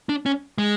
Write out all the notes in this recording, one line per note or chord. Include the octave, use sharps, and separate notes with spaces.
D4
C#4
G#3